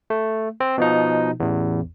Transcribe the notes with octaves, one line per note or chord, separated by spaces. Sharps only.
A3
C4
B2 F3 D#4
A1 E2